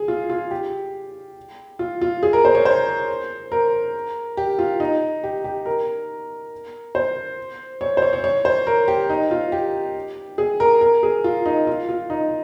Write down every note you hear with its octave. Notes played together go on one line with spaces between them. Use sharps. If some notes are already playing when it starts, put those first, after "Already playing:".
Already playing: G#4
F4
F4
G4
F4
F4
G#4
A#4
C5
C#5
C5
A#4
G4
F4
D#4
G4
G4
A#4
C5
C#5
C5
C#5
C#5
C#5
C5
A#4
G4
D#4
F4
G4
G#4
A#4
A#4
G#4
F4
D#4
F4
F4
D#4